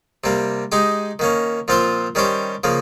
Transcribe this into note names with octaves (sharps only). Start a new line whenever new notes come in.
C3 G3 A#3
G#3 D#4 G4
D#3 A#3 C#4
A#2 F3 C4 F4 C5
D#3 G3 C#4 G4 C5
C#3 F3 A#3